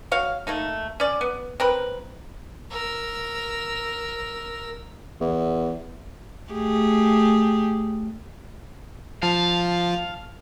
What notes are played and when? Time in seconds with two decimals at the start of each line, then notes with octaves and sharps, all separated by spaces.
0.11 F#4 C#5 F5
0.47 A3 A#3 D#4
1.00 C#4 D5
1.21 B3
1.60 C4 A#4 B4
2.71 A#4 E6
5.21 E2
6.51 A3 G4 G#4
9.23 F3 F5 A5